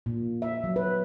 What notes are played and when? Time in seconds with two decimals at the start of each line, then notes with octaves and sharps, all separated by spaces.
0.06 A#2
0.42 E5
0.64 F#3
0.76 B4